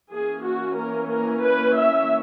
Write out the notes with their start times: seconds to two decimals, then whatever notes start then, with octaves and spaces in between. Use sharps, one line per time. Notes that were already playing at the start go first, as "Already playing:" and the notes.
0.11 E3 A#3 C#4 G#4
0.44 F#4
0.77 A#4
1.10 A#4
1.45 B4
1.78 E5